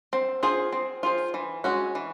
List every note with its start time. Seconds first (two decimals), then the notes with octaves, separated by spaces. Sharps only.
0.13 C4
0.43 F4 G#4 C5
0.72 C4
1.03 F4 G#4 C5
1.34 E3
1.64 G#3 C#4 F#4
1.95 E3